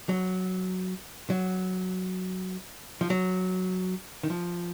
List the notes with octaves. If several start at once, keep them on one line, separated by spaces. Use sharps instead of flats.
F#3
F#3
F3
F#3
D#3
F3